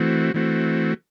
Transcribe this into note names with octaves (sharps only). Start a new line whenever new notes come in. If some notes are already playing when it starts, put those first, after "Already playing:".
Already playing: E3 A3 C4 F#4
E3 A3 C4 F#4